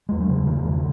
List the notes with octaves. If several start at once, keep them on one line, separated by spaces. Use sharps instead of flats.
E2 G#3
F#3
C#3
E2 D#3
C#3